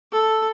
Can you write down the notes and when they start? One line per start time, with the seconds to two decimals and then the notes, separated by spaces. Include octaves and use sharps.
0.12 A4